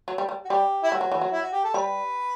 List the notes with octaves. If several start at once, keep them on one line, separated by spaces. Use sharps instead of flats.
F#3
G3
G3
F#4
G3 G4
E4
G3 F#4
F#3
E3
F#3
E4
F#4
G4
A4
G3 B4